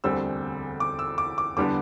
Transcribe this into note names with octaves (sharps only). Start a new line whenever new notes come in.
E1 D2 D3 G3 C4 E6
D6
E6
D6
D6
E2 D3 G3 B3 D4 D6